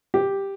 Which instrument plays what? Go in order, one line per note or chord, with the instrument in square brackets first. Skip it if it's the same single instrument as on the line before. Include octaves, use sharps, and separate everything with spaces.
[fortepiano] G4